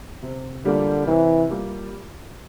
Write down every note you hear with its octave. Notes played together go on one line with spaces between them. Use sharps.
C3
D3 G3 A#3 F4
C3 E3
G3 A#3 F4